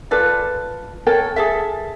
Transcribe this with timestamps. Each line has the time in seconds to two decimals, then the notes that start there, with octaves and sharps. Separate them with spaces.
0.11 F4 A4 B4 D5
1.07 A4 A#4 C#5 G5
1.36 G#4 A4 E5